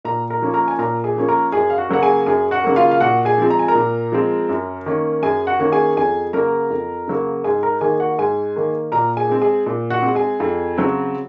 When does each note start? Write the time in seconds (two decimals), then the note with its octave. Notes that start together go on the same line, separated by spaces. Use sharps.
0.05 A#2 A#4 A#5
0.30 A#4 A#5
0.42 F3 A#3 C#4
0.54 A#4 A#5
0.68 G#5
0.79 A#2 A#4 A#5
1.04 G#4 G#5
1.16 F3 A#3 C#4
1.28 A#4 A#5
1.52 F#2 G#4 G#5
1.70 F5
1.78 F#4 F#5
1.89 C#3 F#3 A#3 F#5
2.03 G#4 G#5
2.26 F#2 G#4 G#5
2.51 F#4 F#5
2.64 C#3 F#3 A#3
2.76 F4 F5
2.91 F5
3.00 A#2 F#4 F#5
3.25 G#4 G#5
3.38 F3 G#3 C4
3.50 A#5
3.59 G#5
3.68 A#4 A#5
3.75 A#2
4.12 F3 G#3 C4
4.49 F#2
4.86 D#3 A#3 C#4
5.23 F#2 G#4 G#5
5.47 F#4 F#5
5.60 D#3 A#3 C#4 F#5
5.72 G#4 G#5
5.96 F2 G#4 G#5
6.33 C#3 F#3 A#3 A#4 A#5
6.70 F2
7.08 C#3 F#3 A#3
7.44 G#2 G#4 G#5
7.63 A#4 A#5
7.81 D#3 A#3 G#4 G#5
8.00 F#4 F#5
8.18 G#2 G#4 G#5
8.56 D#3 A#3
8.92 A#2 A#4 A#5
9.17 G#4 G#5
9.29 G#3 C4
9.42 G#4 G#5
9.66 A#2
9.90 F#4 F#5
10.03 G#3 C4
10.15 G#4 G#5
10.40 F2
10.78 C#3 F#3 C4